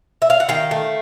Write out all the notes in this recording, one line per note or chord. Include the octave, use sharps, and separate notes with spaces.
E5
F5
F#5
D#3 F5 G5
A3